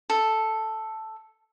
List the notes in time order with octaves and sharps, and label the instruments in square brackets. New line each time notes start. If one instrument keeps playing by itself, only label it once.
[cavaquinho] A4